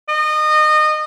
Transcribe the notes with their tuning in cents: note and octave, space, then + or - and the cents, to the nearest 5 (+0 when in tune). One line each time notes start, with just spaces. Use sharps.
D#5 -25